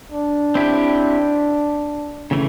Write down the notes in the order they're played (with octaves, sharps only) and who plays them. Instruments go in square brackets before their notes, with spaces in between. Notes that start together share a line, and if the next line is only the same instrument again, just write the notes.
[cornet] D4
[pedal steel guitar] C4 E4 G4
C#3 E3 A3